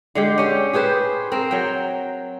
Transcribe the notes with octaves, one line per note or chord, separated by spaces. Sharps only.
D3 G#3 G4
C#4 G4
G4 G#4 B4 C5
C4 A#4
F#3 G5